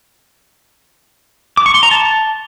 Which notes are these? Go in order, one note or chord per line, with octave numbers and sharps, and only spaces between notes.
D6
C#6
C6
A#5
A5